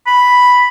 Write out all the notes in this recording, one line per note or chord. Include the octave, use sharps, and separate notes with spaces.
B5